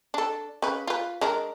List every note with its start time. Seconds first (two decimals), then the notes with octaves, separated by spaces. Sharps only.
0.14 D4 A4
0.62 C#3 B4
0.87 F4 B4
1.21 G#3 D4 A#4